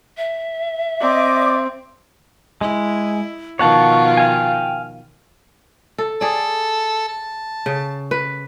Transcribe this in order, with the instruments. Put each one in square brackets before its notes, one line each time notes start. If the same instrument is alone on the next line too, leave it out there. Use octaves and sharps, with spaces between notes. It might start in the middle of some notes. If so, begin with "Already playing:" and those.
[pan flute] E5
[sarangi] C4 [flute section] D5 D#5 D6
[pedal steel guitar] G#3 [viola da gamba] E4
[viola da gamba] B2 D#3 F3 [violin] F4 [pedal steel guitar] C#5 F#5 A5 [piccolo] C#6
[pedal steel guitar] F5 G#5 [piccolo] G5
[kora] A4
[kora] G#4 D5 [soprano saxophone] A4
[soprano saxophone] A5
[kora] C#3
B4